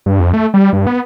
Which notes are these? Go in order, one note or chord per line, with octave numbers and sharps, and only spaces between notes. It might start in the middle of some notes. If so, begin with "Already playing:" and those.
G2
F2
A3
G3
G2
B3